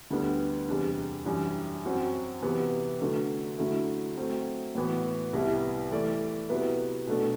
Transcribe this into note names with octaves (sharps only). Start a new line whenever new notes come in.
D2 D3 G3 B3 D4
E2 C3 G3 D4
F#2 E3 G3 D4
F#2 F#3 C4 F#4
C3 E3 B3
D3 F#3 A3
D3 F#3 A3 E4
F#3 A3 C4
A2 E3 B3 F#4
C2 C3 G3 B3 E4
E3 A3 E4 A4 D5
C3 F#3 B3 E4 B4
B2 F#3 A3 D4 A4